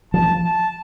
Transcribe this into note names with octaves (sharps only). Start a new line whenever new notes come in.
F3 A5
A5